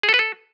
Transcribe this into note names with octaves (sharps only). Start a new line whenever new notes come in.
G#4
A4
B4
A4